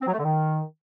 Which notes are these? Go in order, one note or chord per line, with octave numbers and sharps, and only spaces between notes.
C4
F#3
A3
D3
D#3